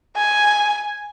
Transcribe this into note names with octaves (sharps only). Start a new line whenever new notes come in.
G#5